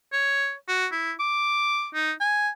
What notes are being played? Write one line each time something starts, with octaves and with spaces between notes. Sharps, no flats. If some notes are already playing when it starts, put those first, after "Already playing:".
C#5
F#4
E4
D6
D#4
G#5